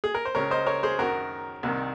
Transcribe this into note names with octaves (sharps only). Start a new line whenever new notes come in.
G#4
A#4
C5
C#2 C#3 A#4 C#5
C5 D#5
A#4 C#5
G#4 C5
F#2 D#3 F#4 A#4
C2 C3 D#3